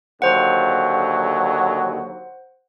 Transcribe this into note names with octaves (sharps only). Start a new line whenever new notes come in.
D#2 D3 F#3 C5 F#5